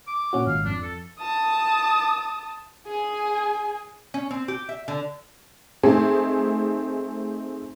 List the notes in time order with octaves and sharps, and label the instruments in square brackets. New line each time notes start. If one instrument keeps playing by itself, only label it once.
[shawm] D6
[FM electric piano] A#2 C#4 F#4
[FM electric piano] G#1 [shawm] F5
[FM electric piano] F2 [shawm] D4
[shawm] A4
[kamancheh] A5 D#6
G#4 G#5
[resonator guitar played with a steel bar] C#4
C4
G4
E5
D3
[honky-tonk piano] A3 C4 D#4 G#4